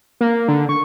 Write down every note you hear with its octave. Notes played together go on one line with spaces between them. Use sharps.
A#3
D3
C#6